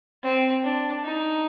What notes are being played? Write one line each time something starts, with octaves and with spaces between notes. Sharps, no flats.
C4
D4
D#4